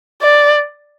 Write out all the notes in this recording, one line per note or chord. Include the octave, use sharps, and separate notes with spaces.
D5